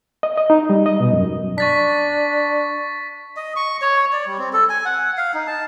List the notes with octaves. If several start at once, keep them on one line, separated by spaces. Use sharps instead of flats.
D#5
D#5
D#4
G3
D#5
B2
F#2
D4 C#6 A6 B6
D#5
C#6
C#5
D5
G3
C4
A4
G#5
F#5
F5
D#4
A5